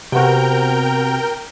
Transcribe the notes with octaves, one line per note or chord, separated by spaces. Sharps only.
C3 B3 F#4 A#4 G5